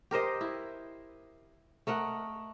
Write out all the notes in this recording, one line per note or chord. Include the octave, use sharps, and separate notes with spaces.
G4 A#4 C5 D#5
E4
A3 A#4 D#5 F#5